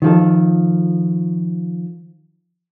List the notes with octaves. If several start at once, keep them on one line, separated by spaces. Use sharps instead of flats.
D#3 F3 A4